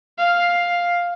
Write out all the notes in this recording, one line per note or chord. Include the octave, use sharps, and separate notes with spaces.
F5